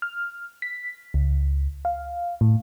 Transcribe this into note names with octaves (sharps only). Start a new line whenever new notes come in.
F6
B6
C#2
F5
A2